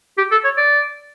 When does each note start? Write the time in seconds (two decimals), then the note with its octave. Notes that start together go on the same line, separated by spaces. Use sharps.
0.18 G4
0.31 A4
0.44 C#5
0.57 D5